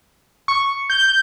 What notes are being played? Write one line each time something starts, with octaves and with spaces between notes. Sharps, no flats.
C#6
G6